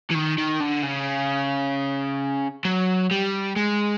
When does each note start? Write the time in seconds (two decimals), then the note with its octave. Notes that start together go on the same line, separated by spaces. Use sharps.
0.11 E3
0.15 D#3
0.38 D#3
0.61 D3
0.83 C#3
2.65 F#3
3.11 G3
3.56 G#3